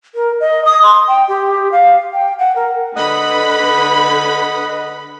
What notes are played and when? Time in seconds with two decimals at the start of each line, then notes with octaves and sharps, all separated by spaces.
0.15 A#4
0.40 D#5
0.65 D#6
0.83 C6
1.08 G5
1.28 G4
1.72 F5
2.13 G5
2.39 F#5
2.56 A#4
2.96 D3 B4 D#5 F#5 B5 D#6